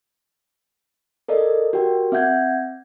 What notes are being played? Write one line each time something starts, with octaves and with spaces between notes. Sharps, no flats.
A4 A#4 D5 D#5
F#4 G4 A#4 G5
C4 E5 F#5 G6 G#6